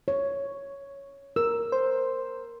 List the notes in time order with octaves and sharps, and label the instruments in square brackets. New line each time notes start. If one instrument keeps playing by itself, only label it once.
[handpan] C#5
[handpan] A#4 [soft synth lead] E6
[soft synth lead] C5